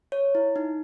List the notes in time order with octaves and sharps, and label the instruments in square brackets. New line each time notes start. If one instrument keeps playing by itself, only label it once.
[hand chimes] C#5
E4
D#4